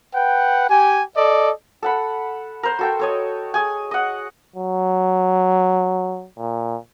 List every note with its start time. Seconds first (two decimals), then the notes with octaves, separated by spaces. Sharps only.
0.14 B4 F#5 G5
0.69 G4 G#5
1.16 A4 D5 D#5
1.82 A4 F#5 B5
2.63 A#4 C5
2.79 F#4 A4 G5
2.99 A4 C#5 D#5
3.54 G#4 G#5
3.91 D#5 F#5
4.56 F#3
6.38 A#2